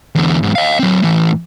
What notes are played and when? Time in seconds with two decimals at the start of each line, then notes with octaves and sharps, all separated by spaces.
0.15 E2 D3
0.43 E2 G#2
0.55 D#5 F5
0.79 F#3 C4
1.02 A2 E3